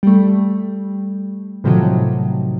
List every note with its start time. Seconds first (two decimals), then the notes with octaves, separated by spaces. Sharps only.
0.03 G3 A3
1.64 A2 C3 D#3 F3 F#3